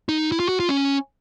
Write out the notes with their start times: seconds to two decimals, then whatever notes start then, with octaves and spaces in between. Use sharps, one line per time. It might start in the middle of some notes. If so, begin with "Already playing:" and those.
0.09 D#4
0.32 E4
0.40 F4
0.49 F#4
0.60 F4
0.69 C#4